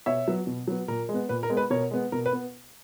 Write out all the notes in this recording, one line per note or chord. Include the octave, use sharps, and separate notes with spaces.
B2 C#5 E5
F#3 B3
B2
F#3 B3
A#2 A#4
G#3
B3
A#2 B4
A#4
G#3 B3
B4
B2 A#4 C#5
G#3 B3
B2 A#4
B4
B3